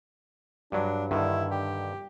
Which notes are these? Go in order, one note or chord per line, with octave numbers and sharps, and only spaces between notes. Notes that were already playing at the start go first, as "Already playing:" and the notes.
G2 F#3 D4
G2 D3 D#3 E4
G4